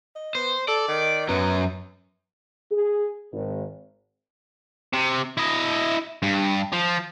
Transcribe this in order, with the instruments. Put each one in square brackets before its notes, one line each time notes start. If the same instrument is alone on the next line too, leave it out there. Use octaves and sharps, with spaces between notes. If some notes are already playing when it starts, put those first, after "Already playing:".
[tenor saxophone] D#5
[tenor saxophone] B3 [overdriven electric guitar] C5
[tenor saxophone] A4 [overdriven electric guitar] D5
[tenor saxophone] D#3
[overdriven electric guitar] F#2 F#3 [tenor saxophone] B3
[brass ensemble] G#4
G#1
[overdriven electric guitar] C3
E4 D#5
G2
F3